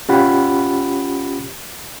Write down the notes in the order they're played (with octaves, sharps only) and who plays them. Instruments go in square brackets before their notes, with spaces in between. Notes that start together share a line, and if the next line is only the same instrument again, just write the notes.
[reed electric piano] C#4 F4 G4 F#5 B5